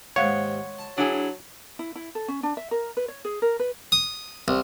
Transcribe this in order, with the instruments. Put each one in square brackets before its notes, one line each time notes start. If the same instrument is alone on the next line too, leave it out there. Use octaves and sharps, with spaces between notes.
[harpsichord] D#2 G#2 [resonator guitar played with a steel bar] G#3 F5 F#5 [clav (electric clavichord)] C#5
[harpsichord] A5
[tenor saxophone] F#3 [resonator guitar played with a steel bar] D4 E4 G#4
[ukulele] E4
E4
A4
C#4
D4
E5
A#4
B4
C#5
G#4
A#4
B4
[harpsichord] D#6
C2